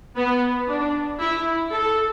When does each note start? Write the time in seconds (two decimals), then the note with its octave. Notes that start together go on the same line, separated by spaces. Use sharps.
0.16 B3
0.68 D4
1.20 E4
1.72 A4